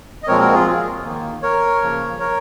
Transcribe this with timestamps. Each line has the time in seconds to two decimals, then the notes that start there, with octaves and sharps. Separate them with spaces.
0.23 D#5
0.27 A#2 F3 G#3 C4 A#4 C#5
0.40 F#4 A#4
0.53 F4 G#4
1.04 D#3 A#3
1.42 A#4 C#5
1.82 C#3 F3 A#3
2.19 A#4 C#5